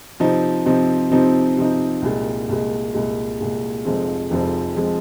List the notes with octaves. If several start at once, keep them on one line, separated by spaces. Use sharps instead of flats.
C3 F3 C4 D#4
C3 F3 C4 D#4
C3 F3 C4 D#4
C3 F3 C4 D#4
C2 A#2 G#3
C2 A#2 G#3
C2 A#2 G#3
C2 A#2 G#3
F1 F2 F3 G#3 C4
F1 F2 F3 G#3 C4
F3 G#3 C4